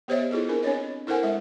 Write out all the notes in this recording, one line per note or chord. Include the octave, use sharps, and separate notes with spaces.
B3 G4 C5 C#5 D#5 E5
E4 F4 G#4 A4
C4 D4 A#4
C4 D4 C#5 D#5
E4 A4 A#4 C5 F#5 G#5
G#3 E5